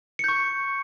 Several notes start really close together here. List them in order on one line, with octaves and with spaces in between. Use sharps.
C#7 G6 C#6